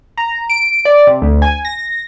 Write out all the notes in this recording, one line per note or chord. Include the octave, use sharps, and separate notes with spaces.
A#5
D7
D5
C3
D2
G#5
A#6